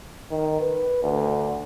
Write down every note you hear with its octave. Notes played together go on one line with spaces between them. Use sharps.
D#3
B4
D2